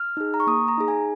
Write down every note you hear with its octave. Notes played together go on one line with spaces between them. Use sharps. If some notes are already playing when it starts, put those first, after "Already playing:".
Already playing: F6
D#4 G#4
A#5
C#6
A#3 D#6
A#5
D#4 G#4
G#5